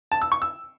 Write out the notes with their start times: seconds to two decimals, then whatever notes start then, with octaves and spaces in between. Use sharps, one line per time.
0.12 A5
0.22 E6
0.32 C#6
0.42 E6